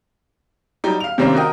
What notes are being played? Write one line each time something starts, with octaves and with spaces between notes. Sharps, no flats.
F#3 G3 D#4
F5 F7
C3 D#3 G3 A#3 C4 C#4
F#4 A#4 D#5 G5